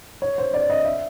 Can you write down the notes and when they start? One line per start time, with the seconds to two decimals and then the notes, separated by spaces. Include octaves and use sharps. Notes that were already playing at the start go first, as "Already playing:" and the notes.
0.22 C#5
0.38 C5
0.54 D5
0.70 D#5
0.85 E5